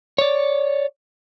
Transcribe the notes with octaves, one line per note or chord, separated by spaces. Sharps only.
C#5 D5